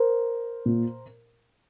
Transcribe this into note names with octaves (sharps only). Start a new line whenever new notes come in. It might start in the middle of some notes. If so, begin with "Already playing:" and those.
Already playing: A#4 C5
A#2